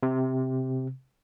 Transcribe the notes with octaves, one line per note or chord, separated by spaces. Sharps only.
C3